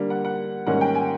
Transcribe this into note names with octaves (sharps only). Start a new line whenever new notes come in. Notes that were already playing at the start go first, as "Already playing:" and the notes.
Already playing: D3 G3 A#3
F#5
F#5
G#2 D#3 G3 A#3 C#4 F#5
G5
G#5